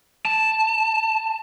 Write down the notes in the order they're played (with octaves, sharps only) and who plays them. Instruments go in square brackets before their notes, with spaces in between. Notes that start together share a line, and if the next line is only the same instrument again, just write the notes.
[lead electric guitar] A5